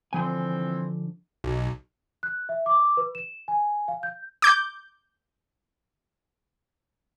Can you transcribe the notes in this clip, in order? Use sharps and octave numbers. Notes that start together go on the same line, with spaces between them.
D3 E3 F3 C4 G#5
B1
F#6
E5
D6
B4
E7
G#5
F5
G6
D6 G6